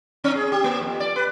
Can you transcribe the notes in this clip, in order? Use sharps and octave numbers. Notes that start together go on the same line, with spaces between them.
C4
G#4
G4
A#3
F2
D5
B4